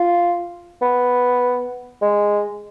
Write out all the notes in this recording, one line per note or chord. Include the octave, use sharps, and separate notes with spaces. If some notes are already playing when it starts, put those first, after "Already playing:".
Already playing: F4
B3
G#3